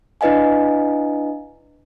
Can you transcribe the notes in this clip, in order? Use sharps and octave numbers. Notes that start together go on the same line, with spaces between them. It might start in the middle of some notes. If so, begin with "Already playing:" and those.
D4 E4 B4 D#5 F5 G#5